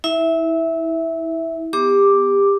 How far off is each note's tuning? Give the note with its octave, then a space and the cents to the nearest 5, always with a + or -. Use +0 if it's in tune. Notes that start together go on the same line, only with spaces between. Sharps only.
E4 -25 E5 +0
B3 +5 G4 +25 D6 +0